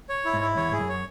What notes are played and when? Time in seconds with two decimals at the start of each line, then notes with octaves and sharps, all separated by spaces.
0.09 C#5
0.25 E4
0.33 G#2
0.41 E4
0.57 E2 C#5
0.72 G#2 G#4
0.80 F#2
0.89 C#5